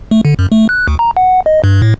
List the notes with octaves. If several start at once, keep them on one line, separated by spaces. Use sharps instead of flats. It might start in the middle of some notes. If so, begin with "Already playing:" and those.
A3
D3
F#2
A3
F#6
D2
A#5
F#5
D#5
G2
A2